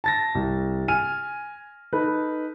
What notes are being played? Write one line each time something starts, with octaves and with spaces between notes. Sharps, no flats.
A5 A6 A#6
C2
G#5 F6 D#7
D#4 A4 B4